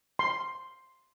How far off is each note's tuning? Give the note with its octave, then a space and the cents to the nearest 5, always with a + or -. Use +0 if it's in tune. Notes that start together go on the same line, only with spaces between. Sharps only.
C6 +0